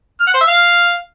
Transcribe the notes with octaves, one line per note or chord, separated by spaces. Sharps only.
F6
F#5
C5
E5
F5